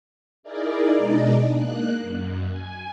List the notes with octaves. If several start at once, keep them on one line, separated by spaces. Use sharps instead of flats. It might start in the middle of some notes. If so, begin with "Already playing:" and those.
D#4 E4 G#4 A#4 D5
B2 G#3 D4 D#4 D5 D#5
A#3 F#6
F#2
G#5